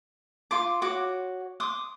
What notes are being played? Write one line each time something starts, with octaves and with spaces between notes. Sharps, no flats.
F4 C6 D6
F#4 C#5 D6
C6 D6 D#6